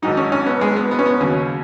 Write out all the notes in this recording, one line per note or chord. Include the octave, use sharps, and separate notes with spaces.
G#1 G#2 F#3 D#4
C#4
C#4
B3
G#3
B3
B3
C#4
B3
D#2 C#3 F#3 C#4